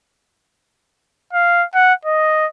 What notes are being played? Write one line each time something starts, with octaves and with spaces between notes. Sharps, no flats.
F5
F#5
D#5